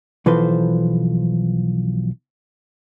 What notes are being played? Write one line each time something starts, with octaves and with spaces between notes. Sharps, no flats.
B1 E3 F3 A4 B4 C5